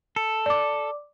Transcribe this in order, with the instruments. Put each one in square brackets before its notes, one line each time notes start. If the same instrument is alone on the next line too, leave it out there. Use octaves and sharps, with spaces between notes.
[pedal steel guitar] A4
[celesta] D5 D6